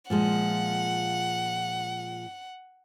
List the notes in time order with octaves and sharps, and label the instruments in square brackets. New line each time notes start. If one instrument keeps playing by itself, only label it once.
[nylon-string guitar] A#2 F3 G#3 [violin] F#5